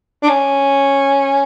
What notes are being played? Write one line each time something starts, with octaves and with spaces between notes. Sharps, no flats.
D4
C#4